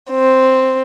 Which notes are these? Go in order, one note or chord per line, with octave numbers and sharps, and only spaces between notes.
C4